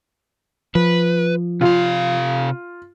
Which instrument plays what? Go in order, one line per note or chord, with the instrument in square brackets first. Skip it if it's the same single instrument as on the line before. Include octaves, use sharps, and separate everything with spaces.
[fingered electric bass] F3 [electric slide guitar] B4
[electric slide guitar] C3 F5 [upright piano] F4